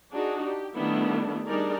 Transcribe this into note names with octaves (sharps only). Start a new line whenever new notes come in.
D4 D#4 F#4 G#4
G4
D#3 G3 A3 B3 D4 E4
G3 D4 D#4 G#4 A#4 D5